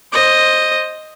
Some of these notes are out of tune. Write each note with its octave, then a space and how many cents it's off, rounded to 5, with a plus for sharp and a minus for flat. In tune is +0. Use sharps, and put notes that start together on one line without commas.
C5 +10 D#5 +0